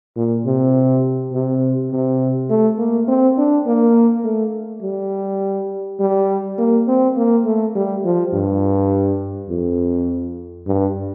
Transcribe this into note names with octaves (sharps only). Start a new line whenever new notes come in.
A#2
C3
C3
C3
A3
A#3
C4
D4
A#3
A3
G3
G3
A#3
C4
A#3
A3
G3
F3
G2
F2
G2